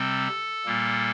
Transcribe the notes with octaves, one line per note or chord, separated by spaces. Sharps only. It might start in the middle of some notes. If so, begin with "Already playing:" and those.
Already playing: C3 G3 C4 A4
A#2 G3 A#3